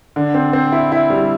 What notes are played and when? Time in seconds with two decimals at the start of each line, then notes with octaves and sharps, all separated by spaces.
0.16 D3
0.34 C4
0.53 C4
0.72 E4
0.92 E4
1.10 G3